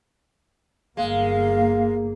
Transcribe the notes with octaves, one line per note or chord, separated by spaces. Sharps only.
G1 G#3 A#3 F5